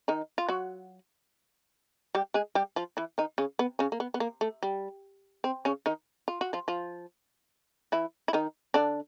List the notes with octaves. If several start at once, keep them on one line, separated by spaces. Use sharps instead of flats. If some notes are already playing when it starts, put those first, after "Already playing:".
D#3 D#4
F4
F#3 F#4
G3 G4
G#3 G#4
G3 G4
F3 F4
E3 E4
D#3 D#4
C#3 C#4
B3
C#3 C#4
A#3
B3
B3
A#3
A3
G3
C4
C#3 C#4
D#3 D#4
F4
F#4
F3 F4
F3 F4
E3 E4
E4
D#3 D#4
D3 D4